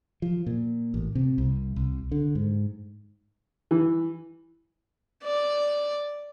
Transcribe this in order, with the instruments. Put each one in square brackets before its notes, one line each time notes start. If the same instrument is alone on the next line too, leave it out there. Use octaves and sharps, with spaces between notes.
[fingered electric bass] F3
A#2
A1
C3
C2
C2
D3
G#2
[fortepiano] E3
[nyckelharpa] D5